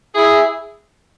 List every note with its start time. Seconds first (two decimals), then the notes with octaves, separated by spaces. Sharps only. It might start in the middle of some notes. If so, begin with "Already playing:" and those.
0.15 E4 G#4